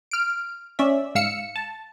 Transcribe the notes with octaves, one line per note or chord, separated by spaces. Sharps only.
F6 D7
C#4 D5 E5
G#2 F5 E6 C#7
A5